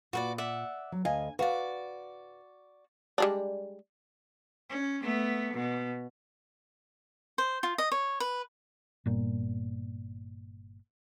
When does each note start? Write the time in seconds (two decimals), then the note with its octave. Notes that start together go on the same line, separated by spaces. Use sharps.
0.13 A#2 F#4 B4 D5
0.38 D5 E5 F#5
0.92 F#3
1.05 D2 D#5 F5 G#5
1.39 F#4 B4 D5 F5
3.18 G3 G#3 D4
4.69 C#4
5.02 A3 B3
5.53 B2
7.38 C5
7.63 F4
7.78 D#5
7.92 C#5
8.20 B4
9.06 G1 A#2